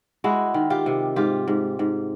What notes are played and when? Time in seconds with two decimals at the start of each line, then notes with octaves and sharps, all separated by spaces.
0.24 G#3 E4 F#4
0.54 D#3
0.70 F4 G4
0.86 C3
1.16 G#2 F4 G4
1.48 G#2
1.79 G#2